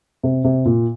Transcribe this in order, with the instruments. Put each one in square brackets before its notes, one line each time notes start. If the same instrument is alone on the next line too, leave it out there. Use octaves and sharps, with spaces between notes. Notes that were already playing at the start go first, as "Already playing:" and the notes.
[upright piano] C3
C3
A#2